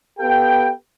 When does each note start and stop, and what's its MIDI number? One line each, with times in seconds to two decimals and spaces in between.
0.19 0.71 59
0.19 0.71 67
0.19 0.71 69
0.19 0.71 77
0.19 0.71 79